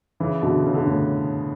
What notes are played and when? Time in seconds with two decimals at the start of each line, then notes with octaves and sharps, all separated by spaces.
0.20 C#3 E3
0.42 B2 D3
0.64 C#3
0.74 D3
0.86 A2 C#3